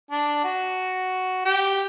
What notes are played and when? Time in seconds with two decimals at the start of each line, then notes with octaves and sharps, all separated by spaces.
0.11 D4
0.44 F#4
1.46 G4